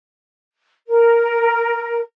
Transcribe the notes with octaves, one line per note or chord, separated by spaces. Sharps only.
A#4